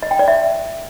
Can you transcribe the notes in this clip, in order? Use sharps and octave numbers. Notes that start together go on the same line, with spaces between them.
D#5
G5
D5
E5